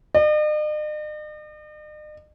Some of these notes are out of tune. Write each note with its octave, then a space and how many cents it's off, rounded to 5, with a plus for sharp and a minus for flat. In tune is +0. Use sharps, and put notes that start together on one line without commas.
D#5 -45